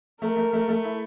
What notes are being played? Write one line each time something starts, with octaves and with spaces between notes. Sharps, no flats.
A3 A#4
A3
A3
A3
E4